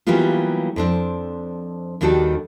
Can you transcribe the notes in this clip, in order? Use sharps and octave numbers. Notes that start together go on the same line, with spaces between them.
E3 F#3 G3 A#3 B3 F4
F2 C4 D4
D#2 D#3 G3 D4 F#4 A4